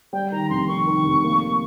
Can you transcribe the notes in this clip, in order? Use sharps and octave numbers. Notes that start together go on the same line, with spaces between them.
G3 G5
D#3 A#5
F1 C6
D#3 C#6
D#3
F1
A#3